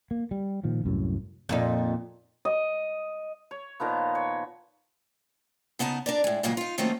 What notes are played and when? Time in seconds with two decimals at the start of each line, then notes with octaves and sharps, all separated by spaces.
0.11 A#3
0.31 G3
0.64 A#2 D#3 F3
0.84 C2 F#2 A2
1.49 F2 A#2 D#4
2.45 D#5
3.51 C#5
3.80 A#2 D#3 F3 B3
4.15 C#5
5.79 C#3 B3 D#4 A#4 A5
6.06 D4 A#4 D5
6.24 A2 G#3
6.43 G2 A#2 C#3 F#3 G#3 A#3
6.57 D#4 F4
6.78 D#3 F#3 A3 A#3 C4 C#4